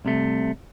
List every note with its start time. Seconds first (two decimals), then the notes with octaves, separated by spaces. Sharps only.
0.05 C2 C3 A3